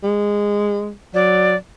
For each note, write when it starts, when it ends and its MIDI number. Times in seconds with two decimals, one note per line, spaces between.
0.04 0.92 56
1.14 1.55 54
1.14 1.56 74